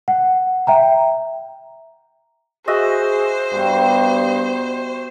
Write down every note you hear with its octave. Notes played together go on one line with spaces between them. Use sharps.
F#5
E5 G5 A#5
F#4 G#4 C5 D#5 E5
G2 B3 G4